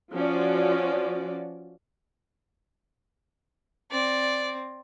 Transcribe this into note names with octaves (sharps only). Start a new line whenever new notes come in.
F3 C#4 F#4 D5
C4 D5